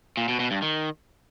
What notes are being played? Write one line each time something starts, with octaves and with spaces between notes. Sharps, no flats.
A#2
B2
B2
G2
D#3